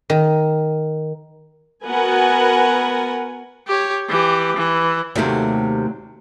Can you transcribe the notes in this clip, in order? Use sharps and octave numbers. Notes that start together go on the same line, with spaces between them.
D#3
B3 F#4 A#4 B4 F#5 G#5
G4 C#5
E3 G4
E3
D#2 C3 F#3 A3